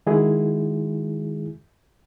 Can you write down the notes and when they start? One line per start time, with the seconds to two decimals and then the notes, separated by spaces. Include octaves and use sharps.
0.06 D#3 G#3 E4 F#4 G#4